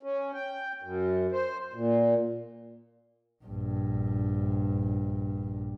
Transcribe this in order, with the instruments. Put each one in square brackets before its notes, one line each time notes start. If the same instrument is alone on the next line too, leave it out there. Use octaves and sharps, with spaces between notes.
[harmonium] C#4
G5
F#2
C5
A#2
[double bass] A#1 G2